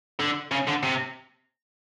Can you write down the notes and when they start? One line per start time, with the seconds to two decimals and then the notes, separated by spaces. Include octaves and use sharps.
0.20 D3
0.51 C#3
0.67 D3
0.83 C3